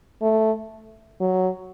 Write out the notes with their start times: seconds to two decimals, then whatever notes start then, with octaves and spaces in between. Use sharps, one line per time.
0.22 A3
1.20 F#3